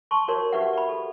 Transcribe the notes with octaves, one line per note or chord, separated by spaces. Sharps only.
A5 C6 C#6
F#4 A#4 C#5 D5 C6
F#4 G4 B4 D5 E5 F#5
D5 B5
A4